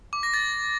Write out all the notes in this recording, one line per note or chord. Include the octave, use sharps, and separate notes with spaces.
D6
A#6
A6